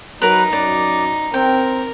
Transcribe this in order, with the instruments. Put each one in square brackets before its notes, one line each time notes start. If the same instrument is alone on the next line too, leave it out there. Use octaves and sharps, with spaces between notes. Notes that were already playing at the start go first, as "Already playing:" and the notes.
[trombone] F#3 [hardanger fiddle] D#4 [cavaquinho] A#4 B4
[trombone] F#2 [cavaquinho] D5
[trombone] C4 [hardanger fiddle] A#4 [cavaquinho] G5